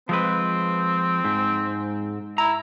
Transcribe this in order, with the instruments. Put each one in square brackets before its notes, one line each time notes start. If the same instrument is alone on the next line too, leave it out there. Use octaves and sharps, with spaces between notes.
[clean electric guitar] F3 G#3 B4 [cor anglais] C4
[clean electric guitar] G#2
[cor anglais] E4 [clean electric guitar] A#5